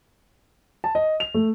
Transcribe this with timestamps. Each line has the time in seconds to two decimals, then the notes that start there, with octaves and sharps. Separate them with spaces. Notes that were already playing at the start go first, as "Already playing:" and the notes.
0.84 A5
0.95 D#5
1.20 F7
1.34 A3